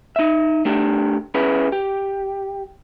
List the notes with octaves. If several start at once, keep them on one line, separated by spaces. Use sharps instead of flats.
D#4 E5
A3 D4 G4
C#4 E4 G#4 B4
G4